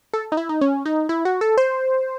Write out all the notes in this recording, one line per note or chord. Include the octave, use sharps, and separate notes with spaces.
A4
D#4
E4
D#4
C#4
D#4
E4
F#4
A4
C5